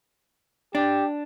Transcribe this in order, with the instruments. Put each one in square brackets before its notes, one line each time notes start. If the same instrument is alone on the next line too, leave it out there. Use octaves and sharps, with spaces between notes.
[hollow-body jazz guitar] D4 [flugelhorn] G4